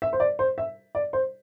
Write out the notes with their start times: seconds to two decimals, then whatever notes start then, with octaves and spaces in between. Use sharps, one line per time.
0.02 E5
0.13 C5
0.20 D5
0.39 C5
0.58 E5
0.95 D5
1.13 C5